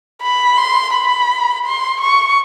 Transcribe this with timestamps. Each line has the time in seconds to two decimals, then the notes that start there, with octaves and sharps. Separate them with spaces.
0.22 B5
0.57 C6
0.93 B5
1.65 C6
2.01 C#6